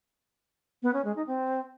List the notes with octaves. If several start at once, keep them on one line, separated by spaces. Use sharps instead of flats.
B3
C#4
G#3
D#4
C4